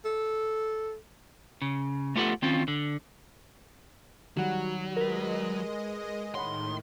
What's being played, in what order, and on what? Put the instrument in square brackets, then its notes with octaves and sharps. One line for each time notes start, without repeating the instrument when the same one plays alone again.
[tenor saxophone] A4
[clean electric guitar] C#3
A3 B3 F4 G4 A4 F#5
D#3 C4 C#4 F4
D3
[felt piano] D#3 G3 [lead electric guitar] F#3 [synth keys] F#4 F#5
[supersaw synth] G#3 D#5 [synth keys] A#4 B4
[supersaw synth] A2 D#3 [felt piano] C#5 F#5 B5 [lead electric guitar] C6